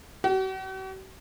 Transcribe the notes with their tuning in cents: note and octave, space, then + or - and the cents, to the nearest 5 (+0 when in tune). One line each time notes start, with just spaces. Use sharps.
F#4 +45